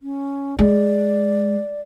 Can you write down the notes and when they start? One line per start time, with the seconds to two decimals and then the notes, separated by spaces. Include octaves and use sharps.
0.02 C#4
0.59 G#3 D5